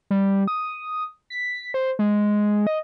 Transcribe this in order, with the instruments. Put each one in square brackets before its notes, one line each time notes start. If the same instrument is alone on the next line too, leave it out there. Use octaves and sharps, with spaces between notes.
[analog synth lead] G3
D#6
B6
C5
G#3
D#5